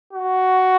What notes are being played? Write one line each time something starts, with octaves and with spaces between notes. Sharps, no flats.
F#4